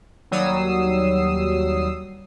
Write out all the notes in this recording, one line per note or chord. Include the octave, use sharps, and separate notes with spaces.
D#2 F#3 G3 D#6 E6 C7